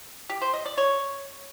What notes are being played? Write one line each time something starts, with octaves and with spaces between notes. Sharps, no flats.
G4
C5
D#5
D5
C#5